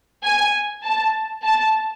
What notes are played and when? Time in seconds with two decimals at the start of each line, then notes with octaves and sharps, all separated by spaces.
0.23 G#5
0.83 A5
1.43 A5